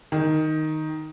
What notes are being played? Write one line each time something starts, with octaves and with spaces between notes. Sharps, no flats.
D#3